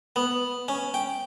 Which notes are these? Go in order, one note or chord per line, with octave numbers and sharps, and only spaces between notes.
B3
C#4
G5